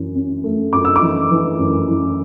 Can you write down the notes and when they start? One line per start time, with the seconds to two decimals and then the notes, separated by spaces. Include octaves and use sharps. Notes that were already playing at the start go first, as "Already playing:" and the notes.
Already playing: F#2 E3 C#4
0.15 C#4
0.44 A3
0.73 F#2 D6
0.85 E6
0.96 D6
1.01 E3
1.30 E3
1.59 F#2
1.89 E3